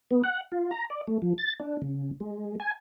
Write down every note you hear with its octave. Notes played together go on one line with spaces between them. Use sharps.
B3
F#5
F4
A#5
D5
A3
F3
A6
D4
C#3
G#3
G#5